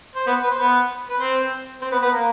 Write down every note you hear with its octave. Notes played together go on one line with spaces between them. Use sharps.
C5
B3 B4
B4
C5
B3 B4
B4
C4 C5
C4 C5
B3 B4
B3 B4
A#3 A#4